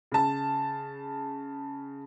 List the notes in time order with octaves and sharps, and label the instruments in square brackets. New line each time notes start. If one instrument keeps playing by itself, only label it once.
[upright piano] C#3 A5